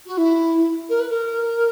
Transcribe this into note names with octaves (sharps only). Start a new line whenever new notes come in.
F#4
E4
A#4
B4
A#4